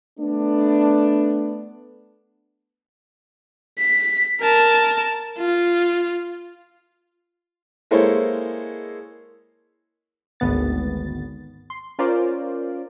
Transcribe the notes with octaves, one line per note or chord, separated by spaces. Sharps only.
A3 B3 D4
B6
A#4 A5
F4
G#3 A#3 E4 A4 C5 C#5
G#1 D2 B3 A6
C6
C#4 F4 A#4 C5 D5